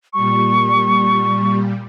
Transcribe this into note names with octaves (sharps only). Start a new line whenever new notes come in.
A#2 G3 C#6